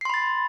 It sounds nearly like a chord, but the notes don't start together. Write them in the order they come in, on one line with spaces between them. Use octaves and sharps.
C7 C6 B5 A6